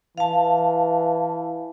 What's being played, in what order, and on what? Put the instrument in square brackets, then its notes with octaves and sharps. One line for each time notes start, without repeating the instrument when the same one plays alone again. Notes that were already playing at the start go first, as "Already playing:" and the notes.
[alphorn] E3 [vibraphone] F5 A5